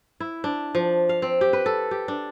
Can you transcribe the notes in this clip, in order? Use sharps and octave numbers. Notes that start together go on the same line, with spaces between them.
E4
D4
F3
F5
C4
G4
B4
A4
G4
D4